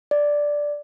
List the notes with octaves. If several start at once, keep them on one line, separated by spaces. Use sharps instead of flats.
D5